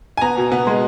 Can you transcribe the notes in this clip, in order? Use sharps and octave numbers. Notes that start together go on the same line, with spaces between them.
G#5
B3 A#5
B2
B3
G#3